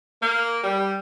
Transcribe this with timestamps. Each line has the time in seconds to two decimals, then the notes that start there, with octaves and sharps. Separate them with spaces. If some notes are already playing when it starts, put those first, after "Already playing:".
0.21 A#3
0.64 G3